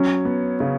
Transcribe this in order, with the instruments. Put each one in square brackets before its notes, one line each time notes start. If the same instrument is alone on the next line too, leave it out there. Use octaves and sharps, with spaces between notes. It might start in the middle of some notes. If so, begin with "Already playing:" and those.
Already playing: [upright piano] F#3 [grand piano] C#4
[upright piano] B3
C#3